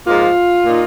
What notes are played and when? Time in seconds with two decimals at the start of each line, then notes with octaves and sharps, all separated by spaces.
0.06 G#2 F3 A#3 D#4 F4
0.64 A#2 A#3 D#4